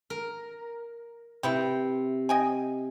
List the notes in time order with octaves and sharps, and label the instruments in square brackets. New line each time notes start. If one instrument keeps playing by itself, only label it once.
[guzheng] A#4
[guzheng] C3 [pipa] E4 B4 G5
[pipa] D#5 G5 G#5